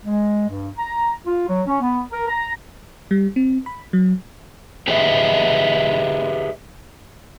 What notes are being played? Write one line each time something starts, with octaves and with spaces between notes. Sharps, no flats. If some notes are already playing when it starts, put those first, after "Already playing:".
G#3
G2
A#5
F4
F#3
C#4
B3
A#4
A#5
G3
C4
B5
F#3
G4 G#4 B4 C#5 D#5 E5